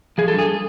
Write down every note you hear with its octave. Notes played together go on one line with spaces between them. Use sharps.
F3 G#4
A4
G2
G#4